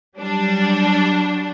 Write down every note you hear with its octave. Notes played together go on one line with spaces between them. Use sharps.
F#3 G3 D4